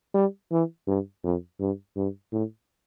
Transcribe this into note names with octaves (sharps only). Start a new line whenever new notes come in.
G3
E3
G2
F2
G2
G2
A2